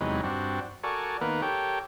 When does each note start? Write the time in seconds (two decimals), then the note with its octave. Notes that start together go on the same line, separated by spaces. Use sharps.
0.01 E2 C3 F#3 G#3 D#4 B4
0.23 G2 C4 D4 F#4
0.83 F#4 A4 A#4 D5 G#5 C#6
1.21 D#3 A#3 B3 A#4 B4
1.42 G4 A4 A#4 C#5 G5